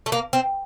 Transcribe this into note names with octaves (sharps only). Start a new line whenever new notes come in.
A3
A#3
C4